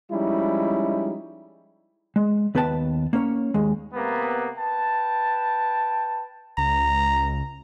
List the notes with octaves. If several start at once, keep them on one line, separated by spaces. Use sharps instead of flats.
F3 G3 G#3 C#4 D#4 E4
G#3
D#2 B3 B4 G5 A5
A#3 C#4 C#5
D#2 G#3
C3 A#3 B3
B4 G5 A5
C#2 A#5